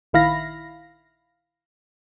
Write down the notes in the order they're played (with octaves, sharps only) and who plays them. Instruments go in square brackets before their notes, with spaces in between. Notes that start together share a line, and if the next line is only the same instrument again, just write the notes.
[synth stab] A#1 D#3 E4 F5 B5 A#6